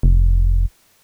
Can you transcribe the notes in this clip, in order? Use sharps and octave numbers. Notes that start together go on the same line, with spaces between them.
F1